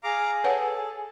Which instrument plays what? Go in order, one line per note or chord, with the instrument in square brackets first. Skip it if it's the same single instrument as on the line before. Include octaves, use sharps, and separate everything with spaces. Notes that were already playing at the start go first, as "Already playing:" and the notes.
[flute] G#4 [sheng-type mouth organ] F5 A#5 D6
[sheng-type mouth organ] A4 [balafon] B4 C#5 F#5